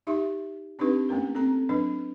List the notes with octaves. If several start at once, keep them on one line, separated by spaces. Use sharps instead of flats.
D#4 G4 E5 C6
C4 D4 D#4 G4 B4
A3 A#3 C#4 A#4
C4 A4 A#5
F#3 D4 B4